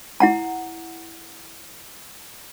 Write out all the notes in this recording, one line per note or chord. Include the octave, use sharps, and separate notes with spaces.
E4 F#5 A#5